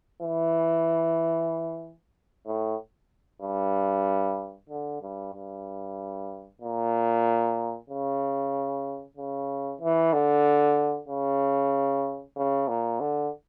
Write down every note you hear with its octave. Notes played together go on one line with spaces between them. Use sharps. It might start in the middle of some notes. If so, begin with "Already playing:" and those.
E3
A2
G2
D3
G2
G2
A#2
C#3
C#3
E3
D3
C#3
C#3
A#2
D3